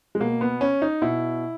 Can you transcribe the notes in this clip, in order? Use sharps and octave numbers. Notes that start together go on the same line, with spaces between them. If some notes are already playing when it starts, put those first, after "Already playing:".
G#3
B2 A#3
B3
C#4
D#4
B2 E4